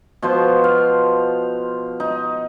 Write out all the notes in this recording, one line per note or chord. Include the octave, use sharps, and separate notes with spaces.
B2 F3 C5
F5
D#4